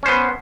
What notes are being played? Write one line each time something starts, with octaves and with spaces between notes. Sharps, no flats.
B3 C#4 C5